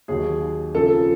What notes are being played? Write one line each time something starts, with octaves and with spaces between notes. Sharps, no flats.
D#2 D#3 F#3 G#4
F2 C#3 F3 A4